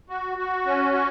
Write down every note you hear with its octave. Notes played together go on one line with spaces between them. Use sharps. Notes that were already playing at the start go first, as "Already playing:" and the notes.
F#4
F#4
C#4
F#4